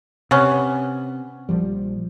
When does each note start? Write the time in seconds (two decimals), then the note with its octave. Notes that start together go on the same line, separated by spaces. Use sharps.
0.31 C3 B3 C#4
1.49 A#1 F3 G3